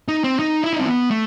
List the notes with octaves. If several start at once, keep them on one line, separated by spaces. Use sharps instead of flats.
D#4
C4
D#4
E4
D#4
C4
B3
A3